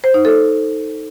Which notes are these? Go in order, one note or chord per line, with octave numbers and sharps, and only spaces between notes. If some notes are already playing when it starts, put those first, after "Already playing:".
C5
D#4
A4